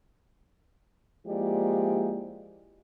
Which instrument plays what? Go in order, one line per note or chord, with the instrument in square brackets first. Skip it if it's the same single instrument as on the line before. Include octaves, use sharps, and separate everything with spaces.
[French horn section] F3 G#3 A#3 E4 G4 D5